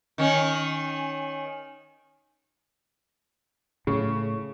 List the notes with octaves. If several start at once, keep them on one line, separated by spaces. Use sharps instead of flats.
D#3 C#4
A2 C#3